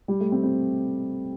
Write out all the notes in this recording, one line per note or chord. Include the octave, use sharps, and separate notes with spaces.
G3
A3
C4
C4